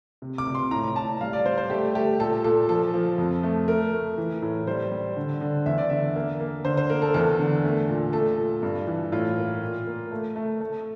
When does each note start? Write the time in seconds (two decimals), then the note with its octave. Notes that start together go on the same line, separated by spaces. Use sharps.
0.22 C3
0.38 D6
0.47 C3
0.55 C6
0.71 A2 A#5
0.96 A2 A5
1.21 G3 F5
1.33 D5
1.45 G3 C5
1.58 C5
1.70 A3 G4
1.95 A3 G4
2.19 A#2 A4
2.44 A#2 A4
2.69 F3 A4
2.94 F3
3.18 F2
3.43 A3
3.68 A3 A#4
3.93 A3
4.18 E3
4.42 A2
4.67 G3 C5
4.92 G3
5.17 D3
5.41 D3
5.66 E2 E5
5.78 D5
5.90 D3 E5
6.15 A#3
6.40 A#3
6.65 D3 C5
6.77 C5
6.90 A#3 A#4
7.02 A4
7.14 E2 A4
7.39 D3
7.64 A3
7.89 A#2
8.13 A3 A4
8.38 A#2
8.63 G2
8.87 E3
9.12 A2 F4
9.37 A#3
9.62 A#2
9.87 A#3
10.11 A3
10.36 A3
10.61 A3